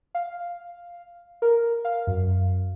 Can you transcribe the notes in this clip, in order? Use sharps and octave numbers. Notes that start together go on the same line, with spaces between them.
F5
A#4
F5
F#2